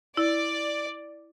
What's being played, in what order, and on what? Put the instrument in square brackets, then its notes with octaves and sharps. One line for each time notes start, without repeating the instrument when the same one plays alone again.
[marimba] E4 [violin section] D5